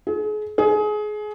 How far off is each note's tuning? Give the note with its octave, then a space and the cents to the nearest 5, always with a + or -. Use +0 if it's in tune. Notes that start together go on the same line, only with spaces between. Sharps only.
G#4 +35
G#4 +25